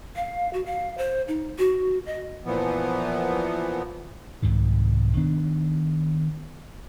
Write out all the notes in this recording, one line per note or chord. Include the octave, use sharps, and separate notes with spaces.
F5
F#4
F5
C5
D#4
F#4
D#5
A#2 E3 F3 B3
C2 G#2 C3 D#3
D#3 B3 D4